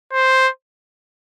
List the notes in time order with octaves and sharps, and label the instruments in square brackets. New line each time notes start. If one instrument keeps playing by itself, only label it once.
[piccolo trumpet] C5